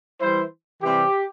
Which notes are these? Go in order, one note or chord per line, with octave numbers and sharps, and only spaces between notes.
E3 G3 E4 C5
C3 E3 G3 C4 G4